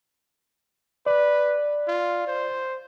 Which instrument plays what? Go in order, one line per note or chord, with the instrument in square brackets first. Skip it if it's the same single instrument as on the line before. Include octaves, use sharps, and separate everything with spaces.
[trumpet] B4 [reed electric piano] D5
[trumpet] F4
C5